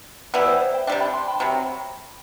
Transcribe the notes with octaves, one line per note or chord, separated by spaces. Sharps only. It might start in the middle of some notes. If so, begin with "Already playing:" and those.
E3 G3 B3 E4 D5 F#5
C5 E5
C5 E5
E5 G5
C3 G3 D4 E5 G5
G5 B5
A5 C6
G5 B5
A5
C3 F#3 G5 B5